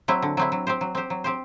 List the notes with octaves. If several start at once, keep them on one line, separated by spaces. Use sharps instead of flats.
F#3 C4 E4
D3
F#3 C4 E4
F#3
C4 G4 C5
F#3
C4 G4 C5
F#3
C4 G4 C5